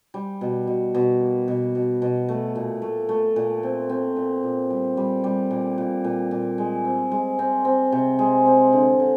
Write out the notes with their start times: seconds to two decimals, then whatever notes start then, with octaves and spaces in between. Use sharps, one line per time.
0.14 G3
0.41 B2
0.67 B2
0.95 B2
1.21 A#3
1.48 B2
1.75 B2
2.02 B2
2.29 A3
2.56 A#2
2.82 A3
3.09 A3
3.36 A#2
3.63 C4
3.90 C4
4.16 A#2
4.44 A#2
4.70 G3
4.97 G3
5.24 G3
5.51 A#2
5.78 A#2
6.04 A#2
6.31 A#2
6.58 G#3
6.85 C4
7.12 G#3
7.39 C4
7.65 C4
7.92 C3
8.19 G#3
8.46 C4
8.73 D3
9.00 D3